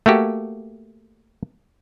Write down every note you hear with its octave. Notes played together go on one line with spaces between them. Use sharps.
A3 A#3 F#4 G4